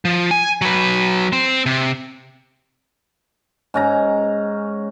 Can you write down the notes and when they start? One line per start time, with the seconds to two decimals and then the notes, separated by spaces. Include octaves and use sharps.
0.05 F3
0.31 G#5
0.62 F#3 B4
1.33 C4 C5
1.66 C3
3.74 G#2 C#4 A#5